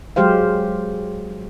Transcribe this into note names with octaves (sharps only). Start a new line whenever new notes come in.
F#3 G#3 G4 C5 F5